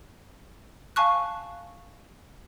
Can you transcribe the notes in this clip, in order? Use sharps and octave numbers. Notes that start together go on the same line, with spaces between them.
F5 G#5 A5 C#6 F#6